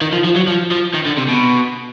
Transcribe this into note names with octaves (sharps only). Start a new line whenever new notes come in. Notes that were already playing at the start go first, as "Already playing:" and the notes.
D#3
F3
F3
F#3
F3
F3
D#3
D3
C3
B2